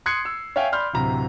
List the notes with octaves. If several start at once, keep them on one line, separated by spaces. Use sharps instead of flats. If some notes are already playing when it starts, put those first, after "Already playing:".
C6 D#6 F#6 G#6 C7 C#7
E6
C#5 E5 F5 G5 G#5
D5 B5 C6 F6 G6
D1 C3 A#5